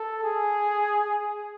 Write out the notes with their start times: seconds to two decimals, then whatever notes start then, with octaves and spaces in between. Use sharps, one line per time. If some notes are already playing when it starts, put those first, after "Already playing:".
Already playing: A4
0.24 G#4